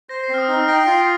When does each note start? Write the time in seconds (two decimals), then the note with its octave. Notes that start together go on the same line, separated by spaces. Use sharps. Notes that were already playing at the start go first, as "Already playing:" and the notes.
0.09 C5 A#6
0.24 C7
0.29 C4
0.34 F6
0.38 D#6
0.48 D#4
0.54 F6
0.68 G5 A#6
0.87 F4 C7